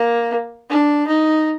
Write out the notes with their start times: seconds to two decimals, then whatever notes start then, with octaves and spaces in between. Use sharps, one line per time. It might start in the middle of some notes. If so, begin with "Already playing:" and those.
Already playing: A#3
0.70 D4
1.07 D#4